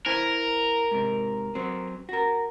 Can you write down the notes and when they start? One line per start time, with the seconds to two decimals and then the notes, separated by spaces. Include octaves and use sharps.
0.06 E4 A#4 C5 G#5
0.91 G#2 C3
1.55 F#3 C4
2.09 F#4 A#4